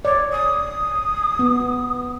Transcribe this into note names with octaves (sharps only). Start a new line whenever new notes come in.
C#5 D5
D#6
B3